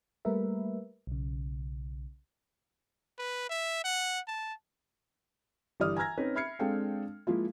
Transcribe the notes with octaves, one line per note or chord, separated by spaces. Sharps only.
G3 A3 A#3 A#4 B4 E5
B1 C#3
B4
E5
F#5
A5
G1 E3 G4 D5 D#6 F6
G#5 A#5 E6 F6 G#6 A#6
C4 C#4 D#4 B4
E5 B5 F6 G#6 C7 C#7
G#3 C4 D4 A4 F5 G5
F3 G#3 A#3 E4 F4